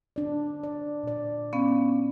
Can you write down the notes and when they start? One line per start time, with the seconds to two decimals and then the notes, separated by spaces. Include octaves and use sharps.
0.16 D4 D5
0.63 D5
1.03 A#2 D5
1.53 B3 C#4 F5